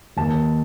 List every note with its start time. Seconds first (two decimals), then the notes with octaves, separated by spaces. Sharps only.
0.17 D#2 A5